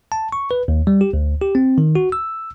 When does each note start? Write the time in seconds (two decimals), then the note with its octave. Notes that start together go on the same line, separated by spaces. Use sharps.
0.12 A5
0.32 C#6
0.51 B4
0.68 D#2
0.87 G3
1.01 G4
1.13 D2
1.41 G4
1.55 C4
1.78 D#3
1.95 F#4
2.12 E6